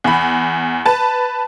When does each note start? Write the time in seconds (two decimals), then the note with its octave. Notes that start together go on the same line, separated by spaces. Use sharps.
0.04 E2 B5
0.86 B4 A5